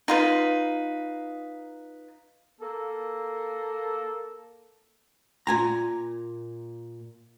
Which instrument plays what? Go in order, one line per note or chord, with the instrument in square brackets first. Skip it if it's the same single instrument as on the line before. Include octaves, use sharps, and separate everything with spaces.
[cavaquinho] D#4 F4 B4
[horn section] A#3 A4
[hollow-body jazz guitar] A#2 G#5 A#5